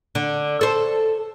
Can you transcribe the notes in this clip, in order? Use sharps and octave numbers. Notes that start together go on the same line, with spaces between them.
D3
A4 C5